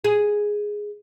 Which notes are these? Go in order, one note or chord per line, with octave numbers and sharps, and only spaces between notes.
G#4